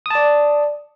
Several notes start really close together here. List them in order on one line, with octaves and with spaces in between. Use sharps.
D#6 A5 D5